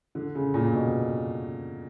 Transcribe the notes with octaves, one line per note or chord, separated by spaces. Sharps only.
D3
C#3
A#2
B2